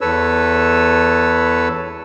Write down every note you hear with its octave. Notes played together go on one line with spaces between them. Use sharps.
E2 A4 B4 C#5 E6